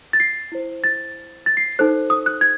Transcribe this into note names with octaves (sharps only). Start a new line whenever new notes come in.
A6
C7
E4 C5
A6
A6
C7
D#4 A4 C5 F#6
D#6
F#6
G#6